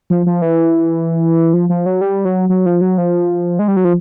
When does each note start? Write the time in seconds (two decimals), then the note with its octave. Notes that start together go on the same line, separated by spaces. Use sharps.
0.10 F3
0.26 F3
0.42 E3
1.53 F3
1.69 F3
1.86 F#3
2.01 G3
2.25 F#3
2.49 F#3
2.66 F3
2.81 F#3
2.98 F3
3.59 G#3
3.68 G3
3.76 F#3
3.85 F3